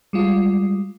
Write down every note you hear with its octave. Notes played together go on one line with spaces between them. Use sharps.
G3 G#3 F4